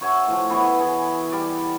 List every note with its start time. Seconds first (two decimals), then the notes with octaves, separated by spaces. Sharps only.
0.01 F#4 C#5 E5 G#5
0.27 A2 F3
0.50 E3 B3 F#4
0.79 E3 G#4
1.32 G3 G4 D5